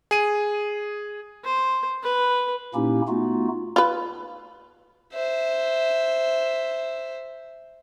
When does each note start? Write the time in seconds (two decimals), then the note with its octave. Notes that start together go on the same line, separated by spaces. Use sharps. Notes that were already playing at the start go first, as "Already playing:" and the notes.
0.11 G#4 D#7
1.45 C5
2.03 B4
2.74 A#2 A#3 C#4 D#4 E4 G4
3.08 A3 B3 D#4 F4 F#4
3.76 F4 B4
5.13 C5 E5